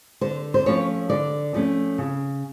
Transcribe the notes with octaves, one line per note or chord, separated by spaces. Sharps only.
D3 C5
C5
F3 A3 C#4 C#5
D3 D5
F3 A3 C#4
C#3